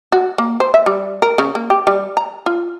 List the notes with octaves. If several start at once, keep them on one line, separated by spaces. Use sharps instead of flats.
F#4
A#3
C5
E5
G3
A#4
C#3
A#3
G4
G3
A#5
F4